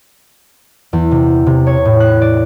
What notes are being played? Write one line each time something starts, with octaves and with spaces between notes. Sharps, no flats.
E2
C3
C3
C#5
A2
F#6
D5